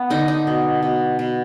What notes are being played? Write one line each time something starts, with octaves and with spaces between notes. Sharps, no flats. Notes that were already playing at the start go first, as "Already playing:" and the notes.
Already playing: B3
D3 D#4
D#4
B2
B2
B2